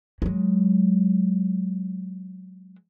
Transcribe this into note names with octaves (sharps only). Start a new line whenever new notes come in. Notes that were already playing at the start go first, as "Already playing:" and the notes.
F#3 G#3